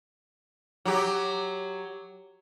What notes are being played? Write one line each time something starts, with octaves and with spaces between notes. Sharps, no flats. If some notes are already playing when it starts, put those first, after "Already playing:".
F#3 G4